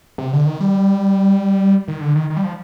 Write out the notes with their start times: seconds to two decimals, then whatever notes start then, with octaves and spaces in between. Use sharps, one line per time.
0.18 C3
0.33 D3
0.46 D#3
0.60 G3
1.88 D#3
2.01 D3
2.15 D#3
2.30 D#3
2.37 G3
2.44 F3